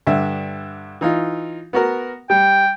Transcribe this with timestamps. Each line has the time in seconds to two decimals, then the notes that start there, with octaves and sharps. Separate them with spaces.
0.07 G2 D3 E5
1.01 E3 D#4 F4
1.73 B3 F#4 A#4
2.30 G3 G5